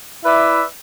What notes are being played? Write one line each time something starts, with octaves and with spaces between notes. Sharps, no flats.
E4 B4 D5 E5